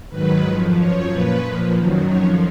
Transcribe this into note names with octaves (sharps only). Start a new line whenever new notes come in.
G#2 D#3 F#3 B4
F2 F3
F#2 F3 C#5
A#2 F3 B4
A#2 F3
F#2 D#3 F#3
F2 F3 C#5